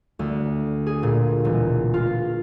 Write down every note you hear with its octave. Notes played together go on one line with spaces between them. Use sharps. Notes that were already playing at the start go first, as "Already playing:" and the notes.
D2
G#4
A#2
E1
F4